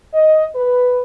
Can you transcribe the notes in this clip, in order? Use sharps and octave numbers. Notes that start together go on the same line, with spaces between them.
D#5
B4